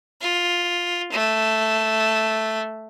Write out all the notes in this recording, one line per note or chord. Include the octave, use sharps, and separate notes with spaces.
F4
A3